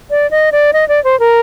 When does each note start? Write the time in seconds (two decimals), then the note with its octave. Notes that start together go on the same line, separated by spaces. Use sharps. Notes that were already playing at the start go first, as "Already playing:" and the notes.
0.10 D5
0.31 D#5
0.52 D5
0.73 D#5
0.88 D5
1.04 C5
1.20 A#4